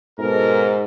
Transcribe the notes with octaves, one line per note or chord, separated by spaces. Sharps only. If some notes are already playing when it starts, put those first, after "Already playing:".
G#2 B2 A4 A#4